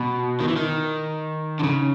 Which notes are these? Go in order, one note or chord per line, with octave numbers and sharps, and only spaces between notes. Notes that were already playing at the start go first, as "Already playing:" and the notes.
Already playing: B2
D#3
E3
D#3
D3
C#3